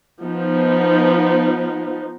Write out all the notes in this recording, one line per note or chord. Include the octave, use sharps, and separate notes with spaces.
F3 B3 D#4